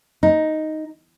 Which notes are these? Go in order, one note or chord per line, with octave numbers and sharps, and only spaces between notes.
D#4